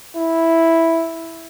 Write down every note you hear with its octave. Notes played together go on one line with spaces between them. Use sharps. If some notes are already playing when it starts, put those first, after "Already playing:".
E4